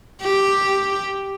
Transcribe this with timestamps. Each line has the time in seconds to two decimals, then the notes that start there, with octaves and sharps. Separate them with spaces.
0.22 G4